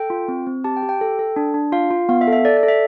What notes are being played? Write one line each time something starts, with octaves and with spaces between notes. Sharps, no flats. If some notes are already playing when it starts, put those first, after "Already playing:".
Already playing: A4 G5
F4
C4
C4
G4 A5
G5
G4
G5
A4
A4
D4
D4
F4 F5
F4
B3 F5
E5
A4
E5
A4 D5
D5
A4
E5